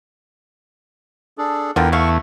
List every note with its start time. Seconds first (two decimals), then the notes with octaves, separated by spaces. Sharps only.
1.38 D4 G#4 A4
1.76 E2 D3 F4 A#4 G5
1.92 A3 F5 C#6